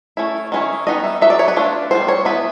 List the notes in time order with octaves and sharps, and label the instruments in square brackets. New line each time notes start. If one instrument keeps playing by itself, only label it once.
[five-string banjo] A3 C#4 E4
D#3 G#3 C#4 E4
G3 B3 D#4 D#5
E5
F#3 B3 D#4 E5
D5
C#5
B4
A3 D4 F4
G3 B3 E4 C5
C#5
G#3 B3 E4 B4